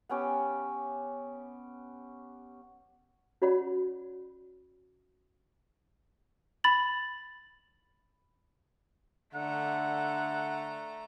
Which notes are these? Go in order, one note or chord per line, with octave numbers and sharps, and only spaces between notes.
B3 C#4 G4
C#4 F#4 C#5 D5 F#5 B5
B5 A6 F#7
D3 A3 F#5 A#5